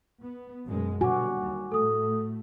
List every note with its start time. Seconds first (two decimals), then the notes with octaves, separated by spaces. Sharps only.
0.20 B3
0.67 F#2 B2 G#3
1.01 B2 D3 G3 F#4 G#5 D6
1.39 D#2
1.72 A2 A3 A4 D#6